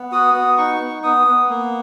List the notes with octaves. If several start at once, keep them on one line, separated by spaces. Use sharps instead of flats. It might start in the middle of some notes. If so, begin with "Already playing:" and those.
Already playing: B3
F#4 D#6
B3 D#6
D#4 C#6
B3
B3 D#6
B3
A#3